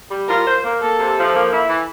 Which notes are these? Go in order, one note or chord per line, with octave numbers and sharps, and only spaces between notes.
G3
F4 A#4
C5
A#3
A#3 A4
C3
F3
A#3
E4
E3